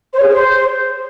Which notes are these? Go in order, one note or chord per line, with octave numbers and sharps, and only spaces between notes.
C5
C#5
G#4
C#5
C5